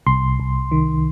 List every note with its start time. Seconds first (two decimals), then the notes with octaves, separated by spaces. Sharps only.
0.07 C2 C6
0.40 C2
0.72 D#3